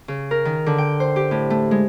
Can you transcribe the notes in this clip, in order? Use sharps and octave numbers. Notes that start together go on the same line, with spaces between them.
C#3
A#4
D#3
D3
G5
C5
G4
A2
A3
G#3